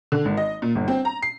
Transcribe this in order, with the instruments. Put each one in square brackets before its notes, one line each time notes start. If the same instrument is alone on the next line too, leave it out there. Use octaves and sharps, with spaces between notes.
[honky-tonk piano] D3
G#1
D#5
A#2
G1
C4
A#5
C7